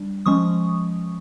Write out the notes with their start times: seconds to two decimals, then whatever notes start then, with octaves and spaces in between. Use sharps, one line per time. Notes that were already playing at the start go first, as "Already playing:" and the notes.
Already playing: G3 D4
0.26 F3 G#3 C#4 C#6 D#6